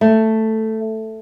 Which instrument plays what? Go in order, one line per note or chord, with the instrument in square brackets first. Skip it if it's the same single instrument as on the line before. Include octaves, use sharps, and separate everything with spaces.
[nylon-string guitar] A3